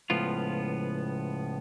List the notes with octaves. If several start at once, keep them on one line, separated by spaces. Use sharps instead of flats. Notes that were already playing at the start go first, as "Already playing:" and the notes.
C#2 A2 F3 B3 F4